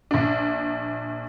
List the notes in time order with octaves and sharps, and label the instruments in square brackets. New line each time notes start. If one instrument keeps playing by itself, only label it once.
[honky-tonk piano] A#1 D4